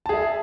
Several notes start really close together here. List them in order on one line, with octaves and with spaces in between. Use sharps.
A5 G#4 E5